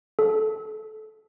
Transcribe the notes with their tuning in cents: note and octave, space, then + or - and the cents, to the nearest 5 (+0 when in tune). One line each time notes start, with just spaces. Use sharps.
A4 -20